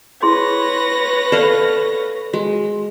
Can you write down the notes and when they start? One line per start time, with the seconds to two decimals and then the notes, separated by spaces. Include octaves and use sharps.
0.22 E4 G#4 B4 C#5 C6 A#6
1.32 A4 D5 F5 F#5
2.33 G#3 F#4